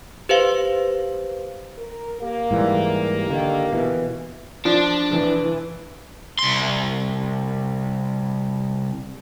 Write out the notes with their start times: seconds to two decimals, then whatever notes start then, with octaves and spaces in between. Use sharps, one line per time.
0.29 G4 B4 C5 F5
1.78 A#4
2.21 A#3 G4
2.51 G#2 E3 G3
3.30 D3 D#3
3.72 B2 E3
4.65 F3 D4
5.11 E3
6.39 C2 C6